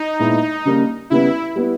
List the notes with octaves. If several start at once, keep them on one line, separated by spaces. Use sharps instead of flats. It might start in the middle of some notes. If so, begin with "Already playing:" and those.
Already playing: D#4
A#2 G#3 B3 E4
C#3 G3 A#3
C#3 G3 B3 E4
G3 B3 E4